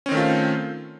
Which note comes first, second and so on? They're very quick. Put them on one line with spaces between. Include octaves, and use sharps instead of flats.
C#4 C4 D#3 A3 F4